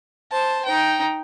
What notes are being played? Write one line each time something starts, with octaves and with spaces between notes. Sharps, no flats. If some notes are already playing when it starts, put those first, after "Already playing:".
C5 A5
D#4 G5